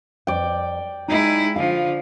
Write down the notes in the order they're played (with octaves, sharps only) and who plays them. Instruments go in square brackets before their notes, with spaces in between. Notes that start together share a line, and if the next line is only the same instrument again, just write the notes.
[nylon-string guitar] F2 [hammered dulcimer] D5 G5
[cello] G#3 E4 [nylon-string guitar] D#4 D#5
[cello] D3 F3 [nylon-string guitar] F5